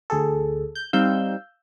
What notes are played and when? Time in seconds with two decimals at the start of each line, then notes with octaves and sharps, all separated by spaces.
0.10 D2 G#4 A4
0.75 G6
0.93 G3 C4 D#4 F5 E6 G6